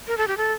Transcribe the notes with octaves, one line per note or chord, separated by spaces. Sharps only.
A#4
A4
G4
A4